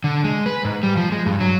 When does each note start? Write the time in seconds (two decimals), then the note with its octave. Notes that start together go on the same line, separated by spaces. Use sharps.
0.04 D3
0.24 G#3
0.46 B4
0.65 G#2
0.83 G3
0.97 F3
1.12 G#3
1.26 G2
1.40 F#3